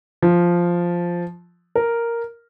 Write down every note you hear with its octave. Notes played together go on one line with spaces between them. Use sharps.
F3
A#4